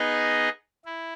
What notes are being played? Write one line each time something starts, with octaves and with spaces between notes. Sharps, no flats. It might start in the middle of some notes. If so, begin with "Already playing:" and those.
Already playing: B3 D#4 G#4 D#5
E4